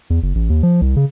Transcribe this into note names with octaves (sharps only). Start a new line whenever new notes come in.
E2
F#1
A1
D#2
F3
C2
C#3